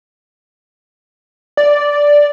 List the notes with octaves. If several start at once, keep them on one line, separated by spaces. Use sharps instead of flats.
D5